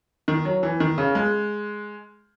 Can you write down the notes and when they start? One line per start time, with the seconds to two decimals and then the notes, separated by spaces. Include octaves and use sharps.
0.28 D#3
0.45 F#3
0.63 E3
0.80 D#3
0.98 C#3
1.15 G#3